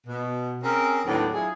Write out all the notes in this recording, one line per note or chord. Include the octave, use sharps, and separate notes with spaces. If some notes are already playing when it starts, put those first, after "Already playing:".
B2
C4 C#4 G#4 A#4
D#2 A2 F#3 B3 C4 D4
F#3 E4 F4 G#4